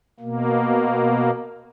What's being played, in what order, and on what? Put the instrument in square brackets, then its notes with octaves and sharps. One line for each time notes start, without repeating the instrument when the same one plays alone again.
[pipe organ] B2 A#3